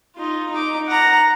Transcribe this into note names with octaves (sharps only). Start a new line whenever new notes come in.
D#4 F4
D#4 D6
F#5 A#5